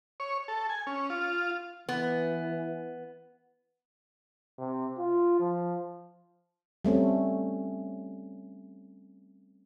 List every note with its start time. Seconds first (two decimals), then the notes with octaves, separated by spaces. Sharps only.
0.20 C#5
0.48 A4
0.69 G#5
0.87 C#4
1.10 F4
1.89 E3 B3
4.58 C3
4.98 F4
5.39 F3
6.85 G3 A3 C4 C#4